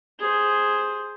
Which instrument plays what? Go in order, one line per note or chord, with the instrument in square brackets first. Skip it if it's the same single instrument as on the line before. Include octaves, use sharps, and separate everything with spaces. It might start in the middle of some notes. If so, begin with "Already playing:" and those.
[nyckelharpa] G#4 C5